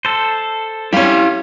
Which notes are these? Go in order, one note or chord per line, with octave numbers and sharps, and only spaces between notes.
A4 C5
G3 C#4 E4 F5